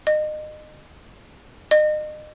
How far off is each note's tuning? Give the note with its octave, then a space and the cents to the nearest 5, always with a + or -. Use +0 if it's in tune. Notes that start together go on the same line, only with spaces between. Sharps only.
D#5 -30
D#5 -35